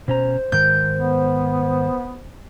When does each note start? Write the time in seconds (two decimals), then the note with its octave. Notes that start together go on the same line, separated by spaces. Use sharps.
0.08 B2 C#4 C5 A#5
0.52 G#2 D#3 A#4 G6
0.95 B3